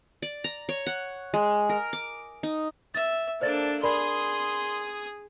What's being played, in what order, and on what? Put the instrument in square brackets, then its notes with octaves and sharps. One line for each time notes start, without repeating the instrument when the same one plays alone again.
[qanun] D5
A#5
C#5
F#5
G#3
A#4
D6
D#4
[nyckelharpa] E5 [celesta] A6
[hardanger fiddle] A#3 D4 [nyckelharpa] A4 [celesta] C5 D5 A6
[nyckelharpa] G#4 D#6 [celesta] A#4 D5 B5 [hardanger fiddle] C6